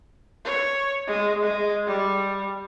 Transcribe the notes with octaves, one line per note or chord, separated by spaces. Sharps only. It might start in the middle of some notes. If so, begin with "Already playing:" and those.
C#5
G#3
G#3
G3